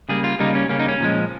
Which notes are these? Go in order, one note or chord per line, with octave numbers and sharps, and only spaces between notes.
C#3 G3 A#3 G#4
F4
C#3 G3 A#3 D#4
C#4
C#3 G3 A#3 C#4
D#4
C#4
A#2 F3 G#3